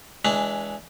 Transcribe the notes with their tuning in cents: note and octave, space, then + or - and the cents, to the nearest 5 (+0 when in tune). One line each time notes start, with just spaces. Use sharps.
E3 +0 G#3 +0 D4 -30